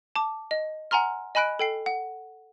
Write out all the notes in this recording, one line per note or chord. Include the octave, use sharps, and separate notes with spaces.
A5 D6
D#5
F#5 G#5 A#5 C6 F6
D#5 G#5 B5 F#6 D7
A4 G5 C7
F#5